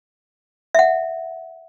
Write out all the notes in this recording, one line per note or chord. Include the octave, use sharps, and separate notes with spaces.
E5 F#5